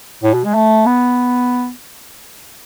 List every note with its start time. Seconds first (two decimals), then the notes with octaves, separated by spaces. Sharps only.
0.23 A2
0.34 B2
0.45 G#3
0.55 A3
0.86 B3